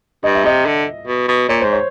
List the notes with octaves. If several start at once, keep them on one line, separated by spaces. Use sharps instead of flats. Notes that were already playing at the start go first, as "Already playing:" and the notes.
G2 D#5
E5
C3 D#5
D3
B2
B2
A#2 C#5
G#2 C5
C#5